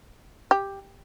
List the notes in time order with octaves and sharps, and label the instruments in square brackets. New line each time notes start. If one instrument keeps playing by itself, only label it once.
[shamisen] G4